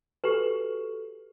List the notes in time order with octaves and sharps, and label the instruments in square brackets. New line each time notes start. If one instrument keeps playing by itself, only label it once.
[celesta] F#4 A4 F#7 [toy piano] G4 B4